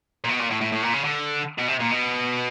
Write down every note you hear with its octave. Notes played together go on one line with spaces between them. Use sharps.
A#2
B2
A#2
A2
A2
A2
A#2
C#3
D3
B2
C3
A#2
B2